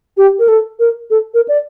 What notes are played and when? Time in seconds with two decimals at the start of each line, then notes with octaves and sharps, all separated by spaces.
0.17 G4
0.39 A#4
0.48 A4
0.79 A#4
1.10 A4
1.34 A#4
1.48 D5